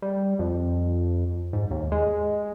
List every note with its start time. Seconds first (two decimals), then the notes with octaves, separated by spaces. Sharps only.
0.02 G3
0.39 F2
1.53 G#2
1.71 D#2
1.92 G#3